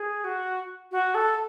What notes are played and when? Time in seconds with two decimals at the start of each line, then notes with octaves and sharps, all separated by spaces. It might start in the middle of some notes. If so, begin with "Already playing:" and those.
Already playing: G#4
0.24 F#4
0.91 F#4
1.14 A4